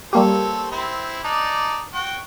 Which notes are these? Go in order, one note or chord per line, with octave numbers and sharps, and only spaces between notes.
G3 A#3 C4 G4 A4 C#5
C4 E4
D4 D#4 D5
F#4 G5